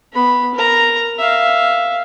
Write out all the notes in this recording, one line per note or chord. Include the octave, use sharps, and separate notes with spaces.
B3 B5
A#4 A#5
E5 F5